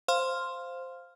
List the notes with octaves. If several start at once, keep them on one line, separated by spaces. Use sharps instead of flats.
C5 F5 C6 F6